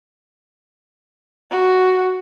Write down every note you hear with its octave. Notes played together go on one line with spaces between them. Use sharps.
F#4